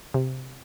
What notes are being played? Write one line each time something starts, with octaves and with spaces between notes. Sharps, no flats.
C3